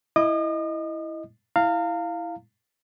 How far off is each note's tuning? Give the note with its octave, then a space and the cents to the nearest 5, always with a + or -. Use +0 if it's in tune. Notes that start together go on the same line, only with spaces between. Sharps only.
E4 +0 D#5 +0 D#6 -45
E4 +0 F5 +0 A#5 -40